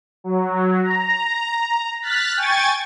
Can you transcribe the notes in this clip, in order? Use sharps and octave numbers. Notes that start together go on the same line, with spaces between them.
F#3
A#5
F6 F#6 A6 B6
G5 G#5 C#6 G#6 A6